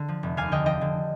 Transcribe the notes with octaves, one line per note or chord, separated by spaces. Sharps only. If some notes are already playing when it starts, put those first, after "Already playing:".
Already playing: D3
F3
F1
D#2 F5 G#5
D3 D#5 G5
F3 D#5 G5
D3